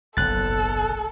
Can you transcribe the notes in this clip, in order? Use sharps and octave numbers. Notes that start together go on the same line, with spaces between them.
F#1 B1 A4 F#6 A6